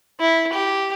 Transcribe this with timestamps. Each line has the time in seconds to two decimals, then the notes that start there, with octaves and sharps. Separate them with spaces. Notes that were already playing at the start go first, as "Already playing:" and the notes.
0.20 E4
0.54 G4